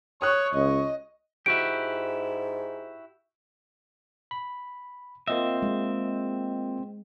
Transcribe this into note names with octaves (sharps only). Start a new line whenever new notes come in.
C#5 C#6 D#6 F#6
C#2 D#5
G#2 E4 F#4 G4 D7
B5
A#3 C4 F4 D#5 E5
G#3